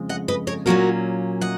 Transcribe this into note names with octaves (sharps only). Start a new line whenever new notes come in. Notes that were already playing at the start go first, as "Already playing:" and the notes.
Already playing: F2 C#3 G#3
D#5 F#5
B4 D#5
A#4 C#5
A#2 F#3 A#3 C#4 F#4 A#4
D#5 F#5